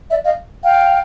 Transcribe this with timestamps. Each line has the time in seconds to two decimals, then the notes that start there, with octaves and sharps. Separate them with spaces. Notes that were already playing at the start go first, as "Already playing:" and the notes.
0.09 D5 E5
0.24 D#5 F5
0.64 F5 G5